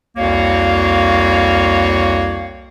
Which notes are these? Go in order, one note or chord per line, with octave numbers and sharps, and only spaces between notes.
C2 F2 A#3 F#4 C#5 F5